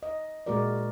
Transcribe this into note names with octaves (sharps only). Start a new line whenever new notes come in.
D#5
A#2 G#3 A#3 F#4 A#4 D5